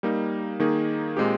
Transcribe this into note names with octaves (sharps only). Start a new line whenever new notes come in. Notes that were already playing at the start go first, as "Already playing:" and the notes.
G3 A#3 D#4
D#3 A#3 D#4 G#4
A#2 G#3 C4 G4